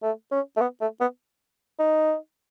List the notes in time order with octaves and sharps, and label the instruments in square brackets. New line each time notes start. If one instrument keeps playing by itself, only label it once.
[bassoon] A3
C#4
A3
B3
A3
B3
D#4